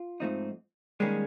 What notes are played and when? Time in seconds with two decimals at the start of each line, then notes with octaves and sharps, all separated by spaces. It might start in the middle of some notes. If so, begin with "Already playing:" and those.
Already playing: F4
0.20 G#2 F3 A3 C4 D#4
1.00 D#3 G3 G#3 A#3 C#4 G#4